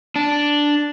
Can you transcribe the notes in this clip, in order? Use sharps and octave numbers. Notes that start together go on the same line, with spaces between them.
D4